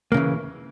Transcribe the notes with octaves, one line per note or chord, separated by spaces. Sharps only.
C#3 E3 A#3